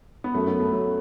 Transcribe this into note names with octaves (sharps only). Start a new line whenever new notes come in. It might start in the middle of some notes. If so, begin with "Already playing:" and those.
B3
F#2 A3
B3
A3
F#3